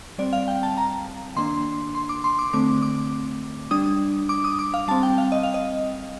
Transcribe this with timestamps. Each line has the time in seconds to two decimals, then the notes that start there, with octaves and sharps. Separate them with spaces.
0.18 G3 C4 D5
0.33 F5
0.48 G5
0.63 A5
0.77 A#5
1.36 D#3 A#3 D4 C6
1.95 C6
2.09 D6
2.24 C6
2.39 D6
2.53 D3 A3 C4 D6
2.82 D6
3.71 G3 D4 D#6
4.29 D6
4.44 D#6
4.59 D6
4.74 F5
4.88 G3 C4 A5
5.03 G5
5.18 F5
5.32 D#5
5.43 F5
5.54 D#5